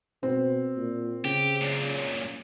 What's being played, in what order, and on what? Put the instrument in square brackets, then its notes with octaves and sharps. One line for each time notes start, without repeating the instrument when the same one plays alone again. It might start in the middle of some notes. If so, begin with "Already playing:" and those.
[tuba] B2 [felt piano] C4
[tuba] A#2
[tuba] C#3 [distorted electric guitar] G4
[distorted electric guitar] F#2 A#2